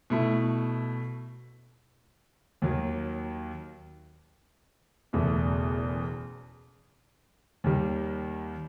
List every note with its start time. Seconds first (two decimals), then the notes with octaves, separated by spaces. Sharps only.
0.10 B2 A3 E4
2.62 D#2 D#3 F#3
5.13 F#1 E2 B2 A3
7.64 D#2 D#3 G3